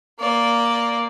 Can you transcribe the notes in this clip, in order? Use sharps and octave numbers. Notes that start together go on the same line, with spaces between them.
A#3 D5